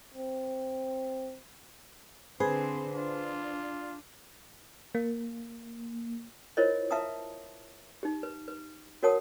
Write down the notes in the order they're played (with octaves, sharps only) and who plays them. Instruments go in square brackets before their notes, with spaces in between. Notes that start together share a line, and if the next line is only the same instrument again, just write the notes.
[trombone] C4
[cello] D3 C4 [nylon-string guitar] G#4 [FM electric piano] B4 C5 C6
[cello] D4 [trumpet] F4
[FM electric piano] A#3
[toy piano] E4 F4 A#4 C5 C#5 D#5
B4 E5 F5 A5 A#5 D#6
D#4 G4
B4
B4
F#4 A#4 C#5 F#5 A5 D#6